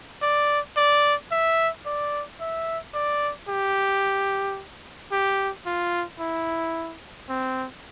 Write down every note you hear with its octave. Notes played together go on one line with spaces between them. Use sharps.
D5
D5
E5
D5
E5
D5
G4
G4
F4
E4
C4